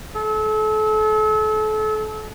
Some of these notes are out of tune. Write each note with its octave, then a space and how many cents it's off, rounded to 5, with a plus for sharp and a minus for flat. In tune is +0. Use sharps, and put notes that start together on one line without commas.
A4 -35